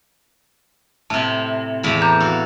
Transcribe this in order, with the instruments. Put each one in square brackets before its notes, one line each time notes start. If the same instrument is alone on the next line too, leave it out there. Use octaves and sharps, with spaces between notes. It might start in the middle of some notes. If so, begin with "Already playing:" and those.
[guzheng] A2 C3 [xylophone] A5
[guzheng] E2 A2 B5
[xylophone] A#5 D6 G6
[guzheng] F#4 A4 F5